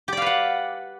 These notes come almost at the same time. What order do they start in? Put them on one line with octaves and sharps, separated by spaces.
G4 D5 F5 B4 F#5